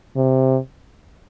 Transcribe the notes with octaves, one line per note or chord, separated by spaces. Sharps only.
C3